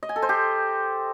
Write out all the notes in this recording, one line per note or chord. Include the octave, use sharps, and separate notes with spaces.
D#5
G#5
A4
C5
G4